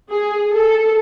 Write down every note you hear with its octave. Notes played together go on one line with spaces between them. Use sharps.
G#4
A4